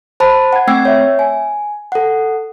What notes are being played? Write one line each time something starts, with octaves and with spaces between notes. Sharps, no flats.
C5 A5 B5
F#5 G#6
A3 C4 G5 E6 G#6 C7
C#5 E5
G#5
A4 F#5